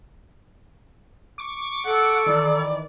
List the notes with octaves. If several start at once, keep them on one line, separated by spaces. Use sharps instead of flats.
C#6 D6
A4 F#5
D#3 E3 D5